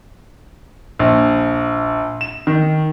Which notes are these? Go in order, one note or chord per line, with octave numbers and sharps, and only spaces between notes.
A#1
E7
D#3